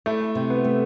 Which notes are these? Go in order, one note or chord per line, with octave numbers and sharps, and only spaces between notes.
A3 E4
C3
B3
A3